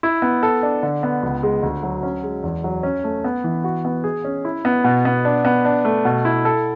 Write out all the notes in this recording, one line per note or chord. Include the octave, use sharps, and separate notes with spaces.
E4
B3
A4
D4
D3
B3
C#2
G#3
D2
F#3
C#4
G#3
E2
F#3
C#4
A3
B3
E3
F#4
B3
G#4
C#4
E4
B3
B2
B3
D4
B3
D4
A3
B2
E4
A4